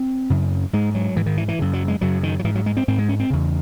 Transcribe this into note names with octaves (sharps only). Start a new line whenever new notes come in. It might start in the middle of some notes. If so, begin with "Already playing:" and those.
Already playing: C4
F#2 C#3
G#2 G#3
F#3
G#2 E3
D#3
E3
E3
F#2 C#3
F#3
G#3
F#2 C#3 F#3
D#3
F#3
G#2 E3
F#3
G#3
C4
G#2 C4
G#3
C#4
C4
E2 C#3